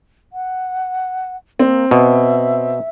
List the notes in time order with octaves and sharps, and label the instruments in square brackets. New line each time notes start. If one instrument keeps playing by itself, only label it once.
[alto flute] F#5
[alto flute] A#3 [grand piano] C4
[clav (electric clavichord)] B2 [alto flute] E5